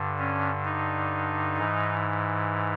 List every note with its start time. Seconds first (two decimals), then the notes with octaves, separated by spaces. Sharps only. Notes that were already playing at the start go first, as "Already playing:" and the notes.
Already playing: G2 D3
0.19 C#4
0.65 D#4
1.57 G#2 E3